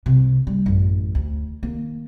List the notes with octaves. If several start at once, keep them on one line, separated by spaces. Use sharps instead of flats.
C2 C3
G3 A#3
A1 F#2
D2
D#3 A#3